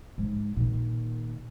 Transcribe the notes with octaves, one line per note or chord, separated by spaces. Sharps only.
G#2
A#2 D#3